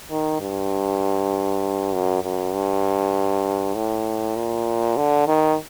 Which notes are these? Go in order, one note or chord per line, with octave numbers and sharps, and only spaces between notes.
D#3
G2
F#2
F#2
G2
A2
A#2
D3
D#3